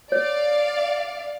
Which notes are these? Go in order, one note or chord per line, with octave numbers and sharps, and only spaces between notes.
C#5 D5 F5